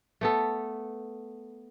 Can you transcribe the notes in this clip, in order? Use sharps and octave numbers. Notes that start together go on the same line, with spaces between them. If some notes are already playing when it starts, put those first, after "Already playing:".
A3 B3 A4